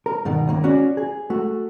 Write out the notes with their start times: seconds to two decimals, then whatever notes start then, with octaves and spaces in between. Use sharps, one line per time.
0.06 A#4
0.25 G2 B2 D#3
0.47 C#2 D#3 A#3
0.64 C#4 F#4 G#4 D5
0.97 G#4
1.30 A3 F#4